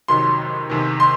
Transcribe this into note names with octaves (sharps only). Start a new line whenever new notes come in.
F2 C3 D#3 F#3 C6
E2 C3 D#3
C6